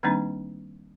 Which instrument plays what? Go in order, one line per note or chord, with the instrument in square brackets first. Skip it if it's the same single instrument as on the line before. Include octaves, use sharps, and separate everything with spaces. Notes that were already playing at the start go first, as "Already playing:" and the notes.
[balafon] D#3 G3 A#3 C4 D4 D#4